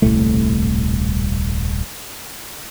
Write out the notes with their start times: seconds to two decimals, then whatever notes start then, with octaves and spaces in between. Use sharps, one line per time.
0.02 D#1 C2 A2 A3